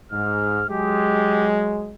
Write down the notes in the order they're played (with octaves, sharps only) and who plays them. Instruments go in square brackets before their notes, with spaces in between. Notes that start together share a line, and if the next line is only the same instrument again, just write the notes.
[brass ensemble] G#2 [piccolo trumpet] F6
[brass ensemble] F#3 G#3 [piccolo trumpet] G4